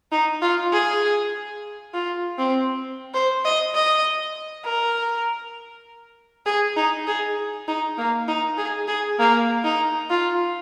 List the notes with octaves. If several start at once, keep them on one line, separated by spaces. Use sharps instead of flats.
D#4
F4
G#4
F4
C4
C5
D#5
D#5
A#4
G#4
D#4
G#4
D#4
A#3
D#4
G#4
G#4
A#3
D#4
F4